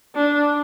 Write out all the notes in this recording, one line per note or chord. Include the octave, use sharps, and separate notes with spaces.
D4